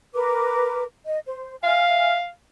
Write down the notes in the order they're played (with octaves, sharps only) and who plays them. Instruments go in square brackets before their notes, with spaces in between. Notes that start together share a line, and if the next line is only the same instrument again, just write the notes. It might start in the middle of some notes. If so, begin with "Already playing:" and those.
[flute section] A#4 B4 D6
D#5
C5
[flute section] E5 G#5 F6 [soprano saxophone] F5